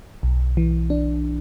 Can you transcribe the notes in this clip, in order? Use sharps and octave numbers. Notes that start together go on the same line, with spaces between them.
B1
E3
D4